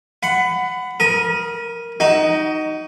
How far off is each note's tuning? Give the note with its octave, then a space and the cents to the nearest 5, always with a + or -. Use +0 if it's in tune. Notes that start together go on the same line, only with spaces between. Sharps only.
F#5 +0 B5 +25
A#4 +0 B5 -45 D#6 +0
D#4 +0 F#4 +30